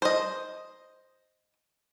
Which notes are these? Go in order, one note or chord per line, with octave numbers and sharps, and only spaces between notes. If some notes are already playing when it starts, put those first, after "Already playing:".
C5 D#5